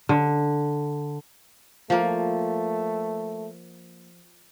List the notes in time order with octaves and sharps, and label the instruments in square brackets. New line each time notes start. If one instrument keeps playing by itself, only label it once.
[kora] D3
[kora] F3 A#3 [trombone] A3